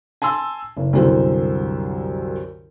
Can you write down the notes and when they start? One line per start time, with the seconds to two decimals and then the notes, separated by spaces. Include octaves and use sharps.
0.22 G#5 A5 C6 E6
0.77 F#1
0.93 C2 F#2 D3 G3 C5